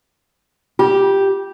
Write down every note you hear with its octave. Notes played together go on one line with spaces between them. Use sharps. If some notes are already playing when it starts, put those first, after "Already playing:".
F4 G4